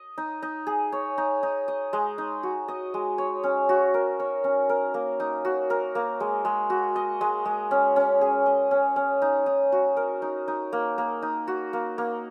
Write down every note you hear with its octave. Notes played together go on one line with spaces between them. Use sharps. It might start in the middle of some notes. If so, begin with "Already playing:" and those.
Already playing: D#5
D#4
D#4
G#4
C#5
D#4
D#4
D#5
G#3
D#4
F#4
D#5
G#3
C#5
C#4
F#4
A#4
C#5
C#4
A#4
A#3
D#4
F#4
A#4
A#3
G#3
G#3
F#4
D#5
G#3
G#3
C#4
C#4
G#4
D#5
C#4
C#4
D#4
D#4
F#4
A#4
D#4
D#4
A#3
A#3
D#4
F#4
A#3
A#3